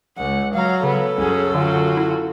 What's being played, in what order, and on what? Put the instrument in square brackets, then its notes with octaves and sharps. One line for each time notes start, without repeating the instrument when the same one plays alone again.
[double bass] C#2 [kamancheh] F#5
[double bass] F#3 [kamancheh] F5 A#5
[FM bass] C#3 [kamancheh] B3 [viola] A4
[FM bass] C2 [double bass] F#2 [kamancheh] C#4 G#4
[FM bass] D3 [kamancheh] F4 F#4
[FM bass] E4